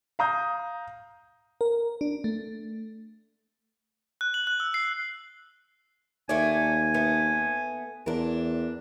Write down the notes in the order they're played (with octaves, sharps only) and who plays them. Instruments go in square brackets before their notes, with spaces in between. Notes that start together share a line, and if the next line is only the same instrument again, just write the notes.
[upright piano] F5 A#5 D#6 G6
[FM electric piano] A#4
D4
A3
[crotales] F#6
F#7
F#6
E6
C7
[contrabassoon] D#2 [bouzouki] A3 A#3 D5 [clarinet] G#5
[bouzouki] A3 B3
[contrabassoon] E2 [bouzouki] D4 A#4